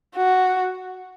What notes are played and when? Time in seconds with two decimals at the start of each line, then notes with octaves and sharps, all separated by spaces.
0.16 F#4